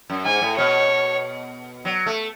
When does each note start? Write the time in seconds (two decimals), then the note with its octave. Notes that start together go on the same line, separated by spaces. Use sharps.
0.10 F#2
0.25 G#2 G#5
0.42 A2
0.57 B2 C#5
1.85 F#3
2.06 A3